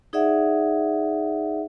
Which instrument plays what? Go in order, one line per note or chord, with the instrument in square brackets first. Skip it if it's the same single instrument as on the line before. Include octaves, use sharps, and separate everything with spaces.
[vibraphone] D#4 G#4 D5 E5 F#5